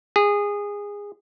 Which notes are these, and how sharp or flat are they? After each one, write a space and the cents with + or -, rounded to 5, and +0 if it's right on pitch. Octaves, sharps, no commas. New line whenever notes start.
G#4 -20